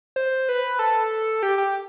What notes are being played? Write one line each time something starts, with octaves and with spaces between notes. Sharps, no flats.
C5
B4
A4
G4
G4